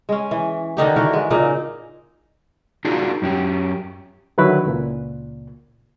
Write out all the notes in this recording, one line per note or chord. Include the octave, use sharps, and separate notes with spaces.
G#3 C#4
E3
D3 D#3 D#4 G4
D3 E3 F#4 A#4
G#3
A#2 C#3 A#3 D#4
D4 D#4 F4 F#4 G#4 A#4
F#2 C#4 G4
D3 D#3 F#3 E4 B4
C#2 A#2